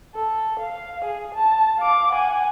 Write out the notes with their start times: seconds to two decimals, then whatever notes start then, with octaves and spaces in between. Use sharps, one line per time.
0.15 A4
0.59 F5
1.04 G#4
1.35 A5
1.79 F5 D6
2.11 F#5 G#5